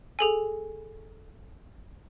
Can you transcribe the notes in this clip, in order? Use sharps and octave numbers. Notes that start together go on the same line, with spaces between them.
G#4 A4 G#5